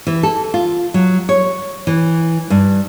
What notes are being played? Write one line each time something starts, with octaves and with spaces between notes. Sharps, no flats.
E3
A4
F4
F#3
C#5
E3
G2